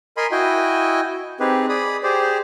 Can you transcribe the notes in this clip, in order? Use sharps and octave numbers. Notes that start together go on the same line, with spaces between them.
A#4 D#5 G#5 B5 C6
E4 F#4 D#5 G5 G#5
C4 D#4 G4 G#4 B4
G#4 D5 B5 D#6
G4 G#4 C5 D5